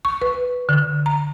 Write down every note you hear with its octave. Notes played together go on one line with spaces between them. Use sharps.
C#6
B4
D3
A#5